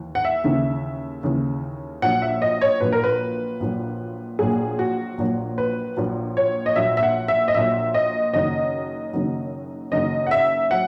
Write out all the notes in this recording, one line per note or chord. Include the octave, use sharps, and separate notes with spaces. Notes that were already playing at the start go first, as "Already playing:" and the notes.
Already playing: D#2 E3
F#5
E5
D#2 C#3 E3
D#2 C#3 E3
A#1 A#2 F#3 F#5
E5
D#5
C#5
A#1 A#2 F#3 B4
A#4
B4
A#1 A#2 F#3
A#1 A#2 F#3 G#4
F#4
A#1 A#2 F#3
B4
A#1 A#2 F#3
C#5
D#5
A#1 A#2 F#3 E5
E5
F#5
E5
D#5
A#1 A#2 F#3 E5
D#5
F#1 F#2 D#3 F#3 D#5
F#1 F#2 D#3 F#3
F#1 F#2 D#3 F#3 D#5
F#5
E5
F#3 F#5